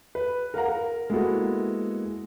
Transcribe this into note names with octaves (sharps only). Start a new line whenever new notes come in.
B4
A#4 F5 F#5 A#5
A#4
G#3 A#3 B3 E4 F#4 A4